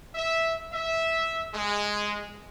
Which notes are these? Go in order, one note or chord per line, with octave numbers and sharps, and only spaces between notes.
E5
E5
G#3